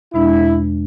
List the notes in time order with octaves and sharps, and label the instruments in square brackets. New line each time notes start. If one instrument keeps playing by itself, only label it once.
[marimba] E2 B2 G#3 D4 [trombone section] E4